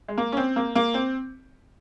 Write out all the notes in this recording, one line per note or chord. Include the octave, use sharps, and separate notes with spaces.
G#3
A#3
C#4
C4
A#3
A#3
C4